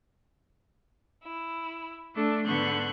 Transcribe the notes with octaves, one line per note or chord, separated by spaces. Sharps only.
E4
A3 D4 A4
G#2 D3 B3 C#6 F#6 G6